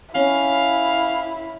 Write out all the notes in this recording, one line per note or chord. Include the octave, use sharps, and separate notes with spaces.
C#4 E4 F5